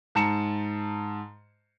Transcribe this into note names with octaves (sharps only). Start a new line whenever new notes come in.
G#2 A5 A#5 C#7 E7